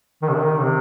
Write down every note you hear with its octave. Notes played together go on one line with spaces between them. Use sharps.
D#3
C3
D#3
C3